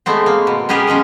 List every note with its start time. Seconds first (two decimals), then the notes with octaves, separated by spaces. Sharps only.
0.06 G#3 A3 B3 C4
0.26 A#3
0.47 B2
0.69 B3 C#4 G4 G#4 A#4 B4
0.87 D#3 F#3 G#3 C#4